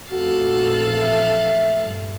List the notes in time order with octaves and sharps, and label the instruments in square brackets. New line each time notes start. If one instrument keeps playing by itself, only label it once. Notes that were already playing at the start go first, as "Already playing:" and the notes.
[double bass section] F1 A#1 E2 [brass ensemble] F#4 [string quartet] A4 F5 F#6
[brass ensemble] E5
[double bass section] G2